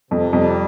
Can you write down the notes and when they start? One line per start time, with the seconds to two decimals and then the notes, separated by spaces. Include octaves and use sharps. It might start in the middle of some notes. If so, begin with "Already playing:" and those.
0.11 F2 C3
0.33 F2 G3